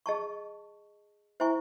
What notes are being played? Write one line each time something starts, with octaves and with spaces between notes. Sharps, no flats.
G#4 D#5 A5 C#6
E4 C5 E5 G#5 C#6